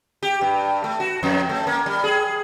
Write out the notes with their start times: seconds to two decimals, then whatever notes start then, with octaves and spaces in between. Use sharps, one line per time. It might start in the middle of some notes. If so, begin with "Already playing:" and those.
0.23 G4
0.41 G2
0.84 A3
1.00 F#4
1.23 F2
1.49 A3
1.67 A#3
1.86 G3
2.04 G#4